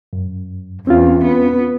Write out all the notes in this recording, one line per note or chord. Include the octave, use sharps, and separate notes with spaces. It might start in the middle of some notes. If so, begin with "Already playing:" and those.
F#2
E2 C4 C#4 F4
B3